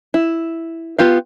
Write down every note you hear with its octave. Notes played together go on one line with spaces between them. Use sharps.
E4
B3 F4 G4 F5